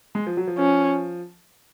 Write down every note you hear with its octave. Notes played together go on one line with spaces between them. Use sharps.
G#3
F3
F#3
F3
F3 C#4